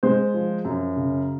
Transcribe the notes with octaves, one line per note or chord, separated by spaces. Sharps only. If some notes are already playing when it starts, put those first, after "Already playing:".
G#3 C5
F3
F#2
C#3